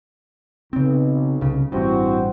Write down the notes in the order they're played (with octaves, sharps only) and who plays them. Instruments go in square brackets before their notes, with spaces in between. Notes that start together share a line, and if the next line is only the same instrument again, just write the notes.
[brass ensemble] B1 [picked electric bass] C#3 C4
[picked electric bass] C2 C#3
[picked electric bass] A1 G2 [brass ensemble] C4 E4 F#4